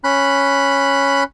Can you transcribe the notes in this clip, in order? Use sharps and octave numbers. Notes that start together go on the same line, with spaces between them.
C#4 B5 F#6